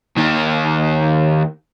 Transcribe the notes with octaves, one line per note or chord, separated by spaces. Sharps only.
D#2 D#3